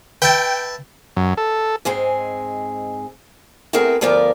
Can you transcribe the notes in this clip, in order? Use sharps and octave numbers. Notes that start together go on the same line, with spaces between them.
B4 E5 G5 A5
F#2
A4
G#2 G#3 C4 G#4
A3 B3 C4 E4 G#4 A#4
D2 F3 B3 F4 A#4 D5